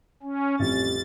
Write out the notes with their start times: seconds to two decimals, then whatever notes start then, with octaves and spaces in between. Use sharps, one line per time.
0.23 C#4
0.59 A1 F2 G3 A6